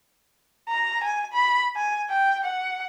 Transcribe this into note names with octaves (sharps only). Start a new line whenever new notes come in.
A#5
G#5
B5
G#5
G5
F#5